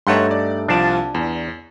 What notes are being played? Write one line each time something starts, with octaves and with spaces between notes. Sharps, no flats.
G2 A3 D#4 C#5 F#5 C6
D5
C2 F3 D4 F4 D5 A5
E2